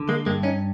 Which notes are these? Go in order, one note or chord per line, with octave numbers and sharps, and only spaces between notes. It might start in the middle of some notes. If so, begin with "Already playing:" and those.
Already playing: D3
G#3 A#3
G2 G#3 A#3
C#4 D#4